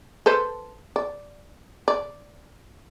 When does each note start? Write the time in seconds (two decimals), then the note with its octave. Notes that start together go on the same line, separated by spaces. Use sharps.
0.26 A4 B4 C5
0.96 D5
1.88 D5